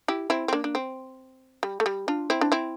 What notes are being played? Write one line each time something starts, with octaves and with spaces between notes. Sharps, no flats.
E4 G4
C4 E4
C4
A#3 D4
D4
C4
G3
A3
G3
D4 F4
C4 E4
D4
C4 E4